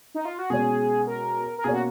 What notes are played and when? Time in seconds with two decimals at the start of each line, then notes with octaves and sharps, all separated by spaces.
0.15 D#4
0.25 F4
0.39 F#4
0.50 B2 G#3 C#4 G#4
1.07 A#4
1.58 A#4
1.64 B2 A#3 C#4 G#4
1.74 F#4